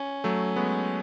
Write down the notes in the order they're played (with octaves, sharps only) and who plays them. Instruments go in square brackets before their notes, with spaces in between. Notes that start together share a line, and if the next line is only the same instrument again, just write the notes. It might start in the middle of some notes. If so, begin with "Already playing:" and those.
Already playing: [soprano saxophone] C#4
[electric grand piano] F#3 A3
G#3 B3